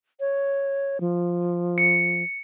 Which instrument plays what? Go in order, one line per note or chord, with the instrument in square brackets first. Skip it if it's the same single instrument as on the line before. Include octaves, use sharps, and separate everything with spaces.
[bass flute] C#5
F3
[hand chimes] C#7